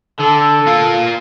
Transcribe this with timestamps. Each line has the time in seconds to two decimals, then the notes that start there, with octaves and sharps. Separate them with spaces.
0.19 D3 A4
0.66 A#3 F4